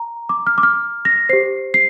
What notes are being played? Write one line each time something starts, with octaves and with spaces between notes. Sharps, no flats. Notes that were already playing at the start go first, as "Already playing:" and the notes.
Already playing: A#5
D6
F6
D6
F6
A#6
G4 C5 C7
C7